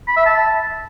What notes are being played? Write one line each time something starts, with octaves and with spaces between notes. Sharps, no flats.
B5
E5
A5